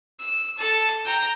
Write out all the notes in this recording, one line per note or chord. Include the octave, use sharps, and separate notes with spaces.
E6
A4 A5
G5 A#5